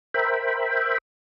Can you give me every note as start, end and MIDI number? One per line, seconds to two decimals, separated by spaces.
0.14 0.98 70
0.14 0.98 72
0.14 0.98 76
0.14 0.98 79
0.14 0.98 83